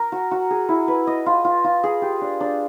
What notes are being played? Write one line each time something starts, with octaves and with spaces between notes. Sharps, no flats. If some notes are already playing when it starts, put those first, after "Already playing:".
Already playing: A#4
F#4
F#4
G#4
E4
B4
D#5
F4
F4
F4
G#4
G4
D4
D4